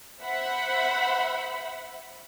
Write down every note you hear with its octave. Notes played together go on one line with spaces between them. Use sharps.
C5 E5 F#5 B5